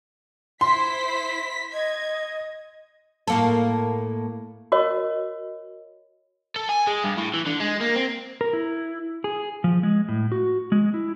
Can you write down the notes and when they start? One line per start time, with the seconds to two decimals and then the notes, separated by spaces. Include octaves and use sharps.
0.61 E4 C5 C6 B6
1.73 D#5 G#6
3.27 A2 A#3 A4
4.72 F#4 A#4 C#5 D#5
6.56 A4
6.69 G#5
6.87 G#3
7.04 G2
7.18 A2
7.34 E3
7.46 D3
7.60 G#3
7.80 A#3
7.95 C4
8.41 A#4
8.53 E4
9.24 G#4
9.64 F3
9.83 G#3
10.09 A2
10.32 F#4
10.72 G#3
10.94 E4